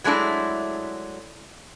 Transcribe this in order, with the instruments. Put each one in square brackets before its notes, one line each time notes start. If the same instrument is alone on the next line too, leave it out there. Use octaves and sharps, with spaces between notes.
[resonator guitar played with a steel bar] F#3 G#3 A3 D4 E4